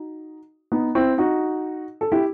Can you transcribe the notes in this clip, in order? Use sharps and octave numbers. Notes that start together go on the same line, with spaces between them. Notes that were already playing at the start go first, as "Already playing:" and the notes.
Already playing: D#4 F#4
B3 D#4
C4 E4
D#4 F#4
A4
E4 G4